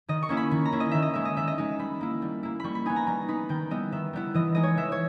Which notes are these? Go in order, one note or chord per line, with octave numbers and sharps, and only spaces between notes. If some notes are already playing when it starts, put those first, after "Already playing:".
D#3 D#5
C#6
A#3 C#4 E4
B5
D#3 B5
A#5
A#3 C#4 E4
D#5
D#3 E5
D#5
G#3 D#4 E5
D#5
D#3 E5
D#5
G#3 D#4
G3 B5
A#3 E4
G3
A#3 E4
G3 B5 C#6
B5
B3 D#4 G#5
A#5
G3 A#5
B3 D#4 B5
D#3 G5
G3 B3 E4 D#5
D#3 E5
G3 B3 E4
E3 D#5
G#3 D#4 D#5
C#5
E3 E5
C#5